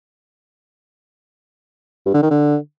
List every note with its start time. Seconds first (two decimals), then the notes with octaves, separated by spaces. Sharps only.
2.06 G2
2.14 D3
2.22 D#3
2.31 D3